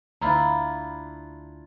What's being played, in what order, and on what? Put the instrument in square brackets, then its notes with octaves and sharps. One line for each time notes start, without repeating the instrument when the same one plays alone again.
[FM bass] D2 [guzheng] D4 E4 F4 [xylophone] A#5 B5